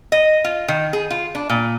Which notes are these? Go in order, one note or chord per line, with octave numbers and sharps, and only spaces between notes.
D#5
F4
D#3
G#4
F4
D4
A#2